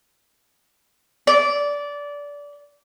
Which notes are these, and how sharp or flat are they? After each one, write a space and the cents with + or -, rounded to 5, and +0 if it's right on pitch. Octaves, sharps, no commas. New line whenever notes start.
D5 -20